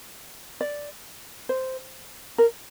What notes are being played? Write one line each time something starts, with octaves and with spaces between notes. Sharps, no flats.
D5
C5
A#4